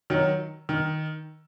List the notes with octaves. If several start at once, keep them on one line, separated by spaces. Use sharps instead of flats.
D#3 F#3
D#3